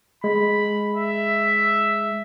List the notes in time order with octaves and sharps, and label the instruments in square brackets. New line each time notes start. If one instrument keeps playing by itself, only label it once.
[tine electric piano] G#3 [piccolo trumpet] B5
[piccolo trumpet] E5